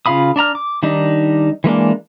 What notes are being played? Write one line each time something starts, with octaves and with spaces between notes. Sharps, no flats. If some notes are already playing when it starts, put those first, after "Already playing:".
C#3 F4 F5 B5 D#6
D4 D5 A#5 F6
D6
D#3 G3 D4 D#4
E3 G#3 A#3 D4